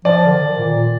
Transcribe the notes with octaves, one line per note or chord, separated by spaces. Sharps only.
F3 D5
D3
D#3
A#2